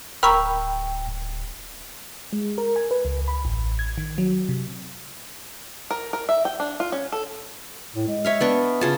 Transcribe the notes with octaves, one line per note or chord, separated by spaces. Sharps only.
D1 A#4 G5 B5 C#6 E6 F6
G#3
A#4
G#5
B4
C#2
B5
A1
G#6
D#3
F#3
C3
A#4
A#4
E5
G5
D4
F4
C#4
A4
A2
G#3
C#5 E5 F5
B3 D4 C#6
C#3 F4 G#4 A5